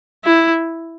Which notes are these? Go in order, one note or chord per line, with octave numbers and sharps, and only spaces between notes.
E4